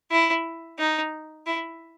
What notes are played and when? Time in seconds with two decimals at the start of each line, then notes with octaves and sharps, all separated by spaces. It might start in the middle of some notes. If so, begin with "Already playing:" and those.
0.11 E4
0.79 D#4
1.47 E4